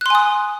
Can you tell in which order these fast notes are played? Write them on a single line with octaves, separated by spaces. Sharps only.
F#6 C6 G#5 D#6